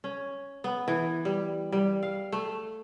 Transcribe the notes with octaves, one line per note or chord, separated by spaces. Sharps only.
C#4
B3
E3
G3
G3
F5
A3